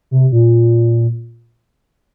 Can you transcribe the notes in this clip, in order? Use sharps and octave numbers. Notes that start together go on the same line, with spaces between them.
C3
A#2